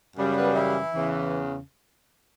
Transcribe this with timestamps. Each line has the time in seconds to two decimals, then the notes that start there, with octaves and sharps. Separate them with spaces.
0.15 F#2 C#3 G3
0.35 B3 B4
0.54 E3 E4
0.95 E2 C#3 E3